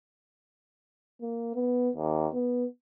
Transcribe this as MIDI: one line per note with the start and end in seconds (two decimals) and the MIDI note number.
1.22 1.51 58
1.55 1.90 59
1.96 2.27 39
2.34 2.65 59